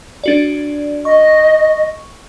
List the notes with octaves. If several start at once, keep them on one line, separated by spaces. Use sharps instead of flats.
D4 F#4 D5
D#5 C#6